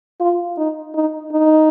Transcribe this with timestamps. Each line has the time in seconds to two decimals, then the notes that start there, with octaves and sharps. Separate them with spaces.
0.20 F4
0.57 D#4
0.95 D#4
1.32 D#4